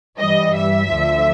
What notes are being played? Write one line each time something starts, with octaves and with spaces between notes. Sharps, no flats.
G2 E3 G3 D#5
E5
D2 D3 F3